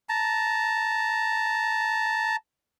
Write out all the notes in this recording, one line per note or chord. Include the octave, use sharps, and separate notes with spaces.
A5 A#5